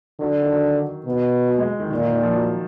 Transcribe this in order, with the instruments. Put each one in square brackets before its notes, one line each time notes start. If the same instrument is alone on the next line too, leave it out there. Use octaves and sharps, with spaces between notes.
[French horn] D3 [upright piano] F#3
[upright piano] D#3
F#3
[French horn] B2
[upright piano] F#3
G#3
D#3
[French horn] A#2 [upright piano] D#3
[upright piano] D#3
D#3
F3
F#3